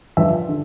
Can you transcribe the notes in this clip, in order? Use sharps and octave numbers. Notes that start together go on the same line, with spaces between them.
G2 D3 F3 E5
D3